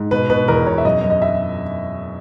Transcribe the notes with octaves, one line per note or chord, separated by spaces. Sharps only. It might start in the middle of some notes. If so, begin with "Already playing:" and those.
Already playing: G#2
B2 B4
B2 B4
E2 A#4
B2 C#5
E5
F#2 D#5
F#2
D#5
E5